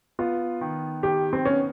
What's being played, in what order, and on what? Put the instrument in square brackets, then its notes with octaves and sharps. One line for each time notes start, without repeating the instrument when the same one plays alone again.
[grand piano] B3 [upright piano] F4
[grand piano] D#3
[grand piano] D#3 [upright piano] G4
[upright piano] C4
[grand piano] B3 [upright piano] C#4